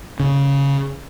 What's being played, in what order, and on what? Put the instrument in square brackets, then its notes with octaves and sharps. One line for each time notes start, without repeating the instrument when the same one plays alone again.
[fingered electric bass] C#3